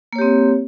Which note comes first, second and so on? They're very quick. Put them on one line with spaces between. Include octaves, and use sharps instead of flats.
A#3 C#5 G4 C4